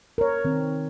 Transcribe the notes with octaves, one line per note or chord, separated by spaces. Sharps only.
A#4 C#5
D#3 C4